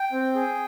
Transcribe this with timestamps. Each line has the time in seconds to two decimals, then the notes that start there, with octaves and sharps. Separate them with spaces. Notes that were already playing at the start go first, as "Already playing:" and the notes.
Already playing: G5
0.12 C4
0.35 G#4